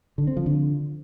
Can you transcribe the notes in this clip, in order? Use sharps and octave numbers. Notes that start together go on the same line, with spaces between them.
D3
C4
F3
D3